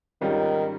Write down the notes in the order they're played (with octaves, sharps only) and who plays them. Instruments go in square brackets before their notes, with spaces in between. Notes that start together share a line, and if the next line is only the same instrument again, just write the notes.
[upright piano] G#2 G3 C#4 F4 [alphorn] D#3